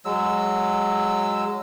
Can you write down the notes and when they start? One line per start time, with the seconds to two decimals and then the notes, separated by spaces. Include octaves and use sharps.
0.05 F#3 G#3 E6